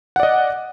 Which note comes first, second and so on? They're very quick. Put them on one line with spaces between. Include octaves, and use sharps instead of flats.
F#5 D5 D#5